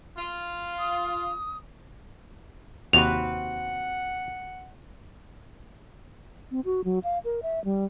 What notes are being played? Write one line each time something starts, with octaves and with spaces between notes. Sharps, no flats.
F4
D#6
D#2 C3 C4 F#4 B4 F#5 F7
C4
F#4
F#3
F5
A#4
E5
G3